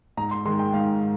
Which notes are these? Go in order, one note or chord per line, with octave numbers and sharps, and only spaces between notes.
G#2 A#5
C6
D#3 G#3 C6
G5
G#2 F5